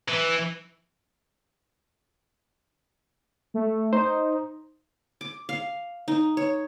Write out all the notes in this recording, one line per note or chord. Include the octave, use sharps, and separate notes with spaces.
E3
A3
D#4 C5
D6
F5
D#4
C#5